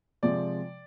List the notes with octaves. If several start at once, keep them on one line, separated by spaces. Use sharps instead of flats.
C3 F3 G#3 D5